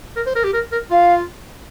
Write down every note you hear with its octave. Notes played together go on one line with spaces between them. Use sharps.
A#4
C5
A#4
G4
A#4
A#4
F4 F5